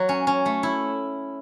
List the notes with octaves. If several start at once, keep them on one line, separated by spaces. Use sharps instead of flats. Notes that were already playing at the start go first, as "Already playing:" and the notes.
Already playing: F#3 A#3
C#4
C#4
A3
E4